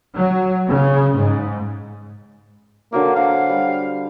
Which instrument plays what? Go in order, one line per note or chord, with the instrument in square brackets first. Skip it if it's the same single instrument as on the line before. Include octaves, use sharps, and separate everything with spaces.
[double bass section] F#3
C#3
G#2
[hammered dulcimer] D3 F#3 F5 [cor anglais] A#3
[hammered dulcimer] C5 F#5 [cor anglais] F5
[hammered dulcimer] G3